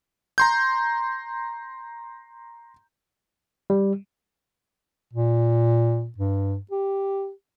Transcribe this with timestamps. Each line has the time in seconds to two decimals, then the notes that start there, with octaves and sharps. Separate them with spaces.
0.38 A#5 C6 G6
3.70 G3
5.13 A#2
6.18 G2
6.71 G4